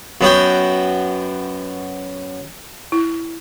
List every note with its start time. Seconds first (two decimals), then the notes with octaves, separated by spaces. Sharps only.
0.21 F#2 B3 F#4 G5
2.92 E4